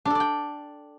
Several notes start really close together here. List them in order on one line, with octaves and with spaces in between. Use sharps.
D4 A4 D5 G5